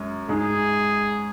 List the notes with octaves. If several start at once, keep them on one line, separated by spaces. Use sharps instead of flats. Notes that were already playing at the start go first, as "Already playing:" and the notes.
Already playing: F#2 G#3
G#2 G#3 D#4 G#4